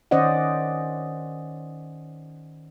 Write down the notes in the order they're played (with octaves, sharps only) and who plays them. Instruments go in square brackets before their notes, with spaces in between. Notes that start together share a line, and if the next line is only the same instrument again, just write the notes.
[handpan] D#3 C#4 C5 D5 D#5 F#5